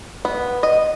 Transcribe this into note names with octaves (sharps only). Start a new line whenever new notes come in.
B3
D#5